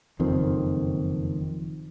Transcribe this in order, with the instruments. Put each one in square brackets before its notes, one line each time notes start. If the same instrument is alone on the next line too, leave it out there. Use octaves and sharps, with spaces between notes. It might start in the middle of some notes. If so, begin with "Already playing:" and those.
[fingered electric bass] F#1 F2 D#3 C4